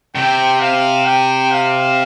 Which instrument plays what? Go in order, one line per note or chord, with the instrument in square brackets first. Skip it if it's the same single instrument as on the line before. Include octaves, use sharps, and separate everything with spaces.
[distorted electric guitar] C3 [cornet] G5
[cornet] F5
G5
F5